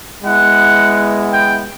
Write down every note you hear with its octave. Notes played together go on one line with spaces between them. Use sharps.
G#3 B3 E4 F#5
G5